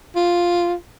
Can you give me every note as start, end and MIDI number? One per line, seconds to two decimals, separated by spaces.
0.16 0.74 65